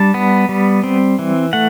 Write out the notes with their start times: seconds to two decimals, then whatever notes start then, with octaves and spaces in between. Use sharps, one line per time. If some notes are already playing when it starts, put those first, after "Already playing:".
Already playing: G3 D4 A5
0.14 B3
0.49 G3
0.84 C4
1.19 E3
1.53 A3 F#5